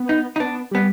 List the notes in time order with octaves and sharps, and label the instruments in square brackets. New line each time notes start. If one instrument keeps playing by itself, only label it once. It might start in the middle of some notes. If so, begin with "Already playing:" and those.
Already playing: [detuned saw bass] B3
[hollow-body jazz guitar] D#4
D#4
[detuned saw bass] B3 [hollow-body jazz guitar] D4
[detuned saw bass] G3 [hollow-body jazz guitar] B3